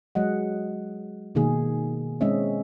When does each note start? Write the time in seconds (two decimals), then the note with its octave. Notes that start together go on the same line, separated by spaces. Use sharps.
0.15 F#3 G#3 D#5 F#5
1.35 B2 D#3 A#3 G#4
2.21 G#3 C4 C#4 D#5 E5